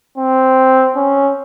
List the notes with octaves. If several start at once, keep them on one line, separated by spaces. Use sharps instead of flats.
C4
C#4